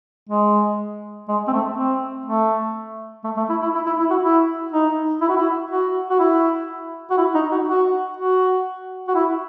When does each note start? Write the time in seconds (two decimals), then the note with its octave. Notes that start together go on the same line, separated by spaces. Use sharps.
0.30 G#3
1.28 G#3
1.48 C4
1.53 A3
1.77 C4
2.26 A3
3.24 A3
3.37 A3
3.50 E4
3.62 E4
3.75 E4
3.86 E4
3.98 E4
4.10 F#4
4.23 E4
4.72 D#4
5.21 E4
5.29 F#4
5.36 E4
5.71 F#4
6.10 F#4
6.19 E4
7.10 F#4
7.18 E4
7.35 D#4
7.52 F#4
7.68 F#4
8.17 F#4
9.08 F#4
9.15 E4